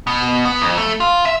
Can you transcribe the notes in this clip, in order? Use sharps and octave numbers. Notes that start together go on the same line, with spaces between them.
B2
B3
F2
A3
F4
E5